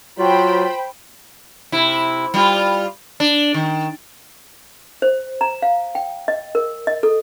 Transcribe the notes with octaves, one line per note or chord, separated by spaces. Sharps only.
F#3 F4 C5 G5 B5
C3 E4
G3 F4
D4
D#3
C5
A#5
F5
G5
D#5
A#4
D#5
A4